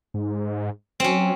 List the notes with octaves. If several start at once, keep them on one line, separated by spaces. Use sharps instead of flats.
G#2
F#3 C4 C#4